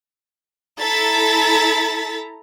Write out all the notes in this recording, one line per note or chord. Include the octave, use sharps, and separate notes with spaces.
E4 A4 A#5 A6 B6